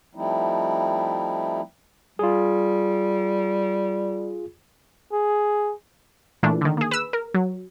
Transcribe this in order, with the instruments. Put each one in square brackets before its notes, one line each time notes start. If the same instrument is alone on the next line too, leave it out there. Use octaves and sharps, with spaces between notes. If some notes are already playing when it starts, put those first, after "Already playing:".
[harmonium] F3 G3 A3 C4 D#4 E4
[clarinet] G3 [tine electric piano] F4 G#4
[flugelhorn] G#4
[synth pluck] A#2 E3 A3 D4
D3 D#3
A#3 G#4
B4 E6
A#4
F#3